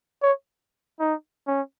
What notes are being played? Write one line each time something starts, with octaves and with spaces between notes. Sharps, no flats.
C#5
D#4
C#4